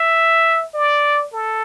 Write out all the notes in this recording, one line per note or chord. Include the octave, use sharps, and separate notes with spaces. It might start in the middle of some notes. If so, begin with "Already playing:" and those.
Already playing: E5
D5
A4